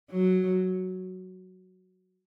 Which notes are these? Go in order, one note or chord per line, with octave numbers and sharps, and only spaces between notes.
F#3